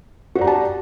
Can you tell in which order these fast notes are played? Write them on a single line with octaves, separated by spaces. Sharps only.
F#4 D5 A#5 G4 A5